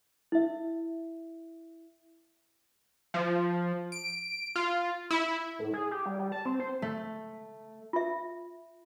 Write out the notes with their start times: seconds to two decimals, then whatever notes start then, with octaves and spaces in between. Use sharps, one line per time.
0.32 E4 E5
3.14 F3
3.92 D7
4.56 F4
5.11 E4
5.59 A2
5.74 G#4
5.91 G4
6.06 G3
6.19 G3
6.32 A5
6.46 C4
6.60 C5
6.82 A3
7.93 F4 E5